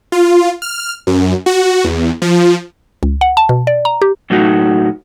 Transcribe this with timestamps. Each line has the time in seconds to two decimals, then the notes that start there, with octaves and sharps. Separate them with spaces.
0.12 F4
0.62 F6
1.07 F#2
1.46 F#4
1.84 E2
2.22 F3
3.03 C#2
3.21 F#5
3.37 A5
3.49 B2
3.67 D5
3.85 A#5
4.02 G4
4.30 A2 F#3 A3 D#4 F#4